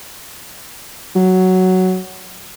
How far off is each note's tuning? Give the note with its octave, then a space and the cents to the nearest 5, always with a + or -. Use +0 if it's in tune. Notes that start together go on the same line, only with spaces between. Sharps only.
F#3 +5